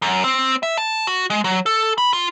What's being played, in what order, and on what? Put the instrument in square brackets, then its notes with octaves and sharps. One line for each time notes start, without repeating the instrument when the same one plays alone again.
[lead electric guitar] F#2
C4
E5
A5
F#4
G#3
F#3
A4
B5
F4